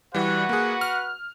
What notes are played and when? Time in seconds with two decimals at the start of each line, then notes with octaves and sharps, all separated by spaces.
0.15 E3 G3 F#4 B4 F#5
0.49 A#3 G#4
0.81 F6